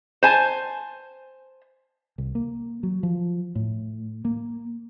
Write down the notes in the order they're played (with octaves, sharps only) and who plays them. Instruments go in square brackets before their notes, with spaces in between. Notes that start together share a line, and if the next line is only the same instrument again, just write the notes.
[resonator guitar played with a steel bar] C5 G#5 A5
[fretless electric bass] C2
A#3
F#3
F3
A2
A#3